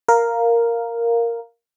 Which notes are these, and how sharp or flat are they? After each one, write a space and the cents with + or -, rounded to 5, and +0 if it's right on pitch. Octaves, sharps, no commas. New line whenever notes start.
A#4 +0 F5 +0